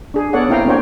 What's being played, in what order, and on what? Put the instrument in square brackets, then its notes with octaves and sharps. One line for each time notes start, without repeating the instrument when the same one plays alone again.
[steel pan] D4 G#4
B3 A4 C#5 D5 F#5
A#3 C4 E4 F5 G5 A#5
A#3 D4 F#4 C5 C#5 G5